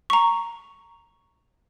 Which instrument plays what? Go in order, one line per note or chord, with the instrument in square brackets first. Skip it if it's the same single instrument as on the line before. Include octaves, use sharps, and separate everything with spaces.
[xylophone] A#5 C#6